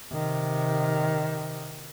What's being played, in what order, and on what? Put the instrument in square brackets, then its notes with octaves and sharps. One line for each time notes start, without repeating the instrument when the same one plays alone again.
[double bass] C3 D#3